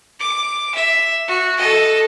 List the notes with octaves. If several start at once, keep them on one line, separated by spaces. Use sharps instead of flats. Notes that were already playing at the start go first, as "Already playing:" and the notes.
D6
E5
F#4
A4 D#5